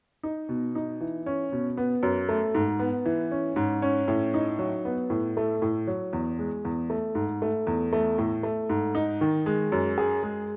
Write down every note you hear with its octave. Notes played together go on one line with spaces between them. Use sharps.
D#4
B2
D#4
E3
C#4
B2
B3
F#2
A3
G#2
B3
E3
C#4
G#2
C#4
A2
D#4
F#3
B3
A2
A3
A2
F#3
E2
G#3
E2
A3
G#2
A3
E2
A3
A2
A3
G#2
D#4
D#3
G#3
F#2
G#4
G#3